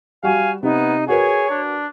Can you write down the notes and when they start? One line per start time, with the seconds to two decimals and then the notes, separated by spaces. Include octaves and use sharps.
0.23 G3 F#4 F5 G#5
0.63 C3 B3 D#4
1.08 F#4 G#4 A#4 B4 C#5
1.50 D4